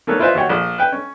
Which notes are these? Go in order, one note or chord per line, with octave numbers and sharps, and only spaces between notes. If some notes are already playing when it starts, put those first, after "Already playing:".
D#3 A#3 A4 B4 C#5
E4 F4 B4 C5 D#5 E5
D#2 F#4 C#5 F#5 G5
A#1
B4 G5
C#4